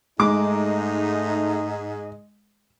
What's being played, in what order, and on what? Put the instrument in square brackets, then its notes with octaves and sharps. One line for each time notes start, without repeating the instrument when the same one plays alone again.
[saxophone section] G#2 D#5 [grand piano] G#3 [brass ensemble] A3 D#4 [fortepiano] D6